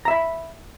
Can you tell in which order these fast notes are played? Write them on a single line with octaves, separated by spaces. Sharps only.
A#5 E5 B5